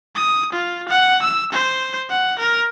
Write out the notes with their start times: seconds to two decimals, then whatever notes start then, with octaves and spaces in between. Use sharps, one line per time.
0.15 D#6
0.52 F4
0.89 F#5
1.22 E6
1.53 C5
2.09 F#5
2.39 A#4